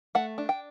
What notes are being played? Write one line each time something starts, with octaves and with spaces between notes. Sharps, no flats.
A3 F#5
D4
G5